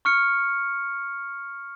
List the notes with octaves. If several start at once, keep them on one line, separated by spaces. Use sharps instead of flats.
C#6 F6 C#7